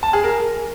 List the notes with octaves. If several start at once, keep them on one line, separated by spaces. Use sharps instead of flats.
A5
G#4
A#4